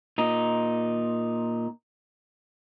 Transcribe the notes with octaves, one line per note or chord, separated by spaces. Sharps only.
A#2 D#4